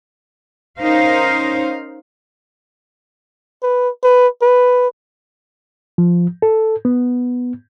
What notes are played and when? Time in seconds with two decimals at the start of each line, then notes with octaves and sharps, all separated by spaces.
0.79 C#4 D#4 A#4 C5 F5
3.63 B4
4.04 B4
4.42 B4
5.98 F3
6.42 A4
6.85 B3